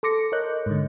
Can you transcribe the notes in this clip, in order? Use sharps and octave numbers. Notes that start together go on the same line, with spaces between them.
A4 C6 D6 A#6 C#7
A#4 C#5 D#5 F#6 G6
G#2 D3